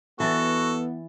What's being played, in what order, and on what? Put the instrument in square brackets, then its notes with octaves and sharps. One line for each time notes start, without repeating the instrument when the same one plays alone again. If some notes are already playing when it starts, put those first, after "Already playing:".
[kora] E3 E4 D5 [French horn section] B3 [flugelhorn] F#4 [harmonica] A4